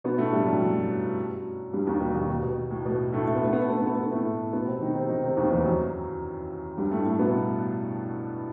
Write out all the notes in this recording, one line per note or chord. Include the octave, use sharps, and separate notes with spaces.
B2 B3
A2 A3
G2 G3
F#2 F#3
F#2 F#3
G2 G3
D#2 D#3
B2
D#2 D#3
B2
B2
A2
B2
A2 A3
A3
B3
A3
B3
A3
B3
A3
B3
A3
B3
A2 A3
B2 B3
C3 C4
D#3 D#4
C3 C4
D#3 D#4
C3 C4
D#2 D#3
E2 E3
F#2 F#3
G2 G3
A2 A3
A2 A3
B2 B3